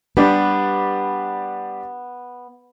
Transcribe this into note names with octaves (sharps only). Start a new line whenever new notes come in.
G3 B3 D4 G4